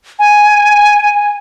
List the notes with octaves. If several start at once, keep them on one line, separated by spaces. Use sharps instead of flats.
G#5